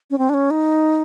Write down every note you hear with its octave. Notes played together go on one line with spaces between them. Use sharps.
C#4
C4
D4
C#4
D#4